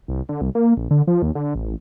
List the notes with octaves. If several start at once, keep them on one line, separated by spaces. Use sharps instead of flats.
C2
D3
C2
A#3
A#1
D3
F3
D#2
D3
A1